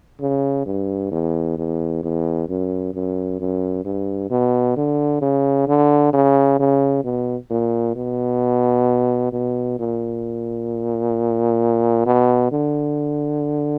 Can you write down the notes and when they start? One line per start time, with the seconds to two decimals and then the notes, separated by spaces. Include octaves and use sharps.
0.21 C#3
0.66 G2
1.12 E2
1.57 E2
2.03 E2
2.49 F#2
2.94 F#2
3.40 F#2
3.85 G2
4.31 B2
4.77 D3
5.22 C#3
5.68 D3
6.13 C#3
6.60 C#3
7.04 B2
7.51 A#2
7.96 B2
9.32 B2
9.79 A#2
12.06 B2
12.52 D3